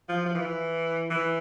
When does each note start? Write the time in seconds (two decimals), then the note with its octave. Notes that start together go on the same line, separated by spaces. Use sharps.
0.09 F3
0.26 F3
0.35 E3
1.10 E3